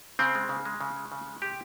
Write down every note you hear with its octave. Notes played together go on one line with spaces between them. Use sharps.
C#3 C4
G#3
C#3
G#3
C#3
G#3
C#3
G#3
C3 G4